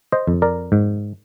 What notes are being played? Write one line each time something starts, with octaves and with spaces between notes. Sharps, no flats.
C5 D#5
F2
A#4 D5
G#2